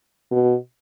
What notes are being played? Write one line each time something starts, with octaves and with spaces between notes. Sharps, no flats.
B2